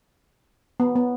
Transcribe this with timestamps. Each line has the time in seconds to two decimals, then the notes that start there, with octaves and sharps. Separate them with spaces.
0.80 B3
0.96 B3